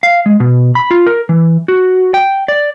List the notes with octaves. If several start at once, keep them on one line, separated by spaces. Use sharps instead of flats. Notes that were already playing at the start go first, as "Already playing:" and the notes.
F5
G#3
B2
B5
F4
A#4
E3
F#4
G5
D5